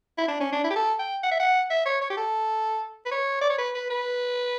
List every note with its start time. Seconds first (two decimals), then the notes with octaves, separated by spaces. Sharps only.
0.18 E4
0.28 D4
0.40 C#4
0.53 D4
0.64 E4
0.70 G4
0.76 A4
0.99 G5
1.23 F#5
1.31 E5
1.40 F#5
1.70 E5
1.86 C#5
2.02 C#5
2.10 G4
2.17 A4
3.06 B4
3.12 C#5
3.41 D5
3.50 C#5
3.58 B4
3.75 B4
3.90 B4